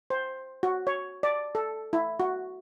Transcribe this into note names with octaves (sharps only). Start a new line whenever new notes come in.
C5
F#4
C#5
D5
A4
E4
F#4